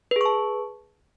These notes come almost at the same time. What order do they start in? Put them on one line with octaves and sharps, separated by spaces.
B4 G#4 C#6 A5